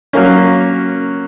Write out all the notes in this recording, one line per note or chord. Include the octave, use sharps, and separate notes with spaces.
F#3 A#3 C#4